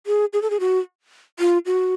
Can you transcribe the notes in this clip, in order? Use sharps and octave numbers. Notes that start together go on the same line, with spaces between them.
G#4
G#4
A4
G#4
F#4
F4
F#4